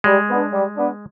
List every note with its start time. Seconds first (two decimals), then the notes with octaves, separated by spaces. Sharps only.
0.04 G3 G#3
0.29 B3 D4
0.52 G3
0.77 B3 D4